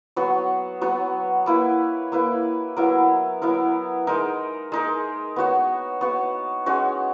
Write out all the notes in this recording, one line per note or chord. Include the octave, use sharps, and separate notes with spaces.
F#3 B3 F#4 C#5
F#3 B3 F#4 C#5
A#3 E4 B4
A#3 E4 B4
F#3 B3 E4 A#4
F#3 B3 E4 A#4
G#3 D#4 A#4
G#3 D#4 A#4
B3 F#4 C#5
B3 F#4 C#5
G#3 C#4 F#4 C#5